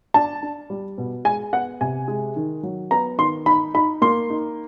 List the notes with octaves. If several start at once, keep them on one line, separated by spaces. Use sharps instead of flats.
D4 A5
D4
G3
B2
G#3 G#5
B3 F#5
C3 G#5
G#3
D#3
F#3
B3 A#5
D#3 C6
D#4 B5
D#4 B5
A#3 C6
D#4